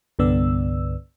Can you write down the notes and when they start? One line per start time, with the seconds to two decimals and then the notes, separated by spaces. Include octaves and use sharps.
0.19 C2 G2 D3 B3 D5 E6